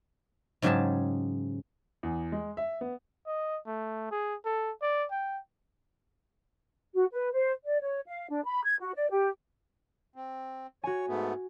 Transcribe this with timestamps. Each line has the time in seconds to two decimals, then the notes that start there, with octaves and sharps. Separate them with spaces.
0.62 G#2 C#3 F#3 G4 G#4 A5
2.03 E2
2.32 G#3
2.57 E5
2.81 B3
3.27 D#5
3.67 A3
4.11 G#4
4.45 A4
4.82 D5
5.11 G5
6.94 F#4
7.13 B4
7.33 C5
7.64 D5
7.82 C#5
8.07 F5
8.29 D4
8.45 B5
8.64 G#6
8.80 F#4
8.95 D5
9.10 G4
10.16 C4
10.84 F#4 C#5 G#5
11.08 G#2 A3 B3